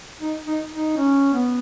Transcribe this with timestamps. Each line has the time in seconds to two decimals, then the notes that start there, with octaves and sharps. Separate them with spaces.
0.21 D#4
0.46 D#4
0.72 D#4
0.97 C#4
1.34 B3